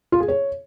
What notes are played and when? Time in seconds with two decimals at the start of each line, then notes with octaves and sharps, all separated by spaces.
0.12 F4
0.20 G#4
0.28 C#5